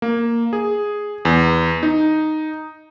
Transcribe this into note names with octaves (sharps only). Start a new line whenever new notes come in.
A#3
G#4
E2
D#4